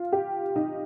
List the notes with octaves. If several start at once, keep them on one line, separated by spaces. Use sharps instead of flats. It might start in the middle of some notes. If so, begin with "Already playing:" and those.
Already playing: F4
G4
D#4